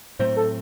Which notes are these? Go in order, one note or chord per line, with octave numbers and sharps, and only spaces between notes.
A2 F#3 A3 C4 C5
A4